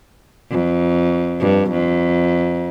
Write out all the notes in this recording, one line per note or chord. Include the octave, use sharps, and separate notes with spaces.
F2
G2
F2